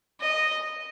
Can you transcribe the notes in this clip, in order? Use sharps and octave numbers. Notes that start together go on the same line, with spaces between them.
D#5